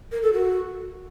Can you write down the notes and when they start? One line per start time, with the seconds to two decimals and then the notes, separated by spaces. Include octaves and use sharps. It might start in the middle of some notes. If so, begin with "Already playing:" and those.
0.12 A#4
0.22 A4
0.33 F#4